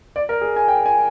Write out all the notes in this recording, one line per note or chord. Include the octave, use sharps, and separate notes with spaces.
D5
A#4
G#4
G#5
G5
G#5